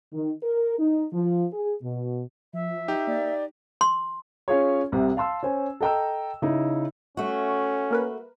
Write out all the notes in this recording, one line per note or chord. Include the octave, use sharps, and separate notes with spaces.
D#3
A#4
D#4
F3
G#4
B2
F3 E5
D#4 G4
A#3 D5
C6
C#4 F4 G#4 C#5
C2 C3
F5 A5 C6 E6
C#4 C5 G#5
A4 D#5 G5 A#5 E6
C#3 D#4 E4
A3 C#4 F#4
A#3 A#4 B4